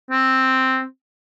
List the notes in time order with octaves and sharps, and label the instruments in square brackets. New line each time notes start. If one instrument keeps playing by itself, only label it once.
[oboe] C4